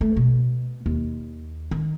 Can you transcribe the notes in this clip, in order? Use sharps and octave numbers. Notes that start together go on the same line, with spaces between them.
A3
B2
D#2
D#3